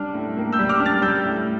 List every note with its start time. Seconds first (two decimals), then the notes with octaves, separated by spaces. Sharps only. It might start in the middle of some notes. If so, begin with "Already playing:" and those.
Already playing: G3 D4 F6
0.15 A2
0.37 A#3
0.53 E6 G6
0.59 G3
0.69 D6 F6
0.80 D4
0.85 F6 A6
1.02 G3 E6 G6
1.25 A2